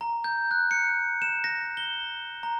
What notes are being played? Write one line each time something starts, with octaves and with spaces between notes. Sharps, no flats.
A#5
G6
F#6
C#7
E7
A#6
G7
A#5